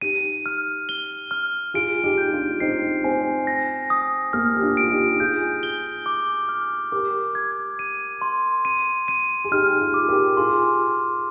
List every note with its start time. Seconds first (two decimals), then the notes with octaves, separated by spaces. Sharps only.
0.02 D#4 G4 D#7
0.46 F6
0.89 G7
1.31 F6
1.74 F4 G#4 D7
2.04 D#4 G4
2.18 G6
2.32 D4 F4
2.60 C4 D#4 C7
3.04 C4 G#5
3.47 A#6
3.90 D#6
4.33 A#3 F6
4.57 G4
4.62 D4 F4
4.77 D7
4.83 F4
4.91 D#4 G4
5.19 F4 G#4 G6
5.63 G7
6.06 D6
6.49 F6
6.92 G4 A#4 D6
7.35 G#6
7.79 D#7
8.22 C6
8.65 D#7
9.08 D#7
9.44 G#4
9.51 D#4 G4 F6
9.80 F4 G#4
9.94 D6
10.08 G4 A#4
10.37 F4 G#4 C6
10.81 F6